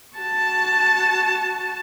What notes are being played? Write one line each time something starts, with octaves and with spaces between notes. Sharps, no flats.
F#4 A5